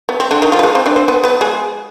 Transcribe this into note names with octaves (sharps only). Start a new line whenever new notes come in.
B3
C4
D3 D4
D#3 D#4
F3 F4
B4
G#3 G#4
C4 C5
D4 D5
C4 C5
B3 B4
B3 B4
G#3 G#4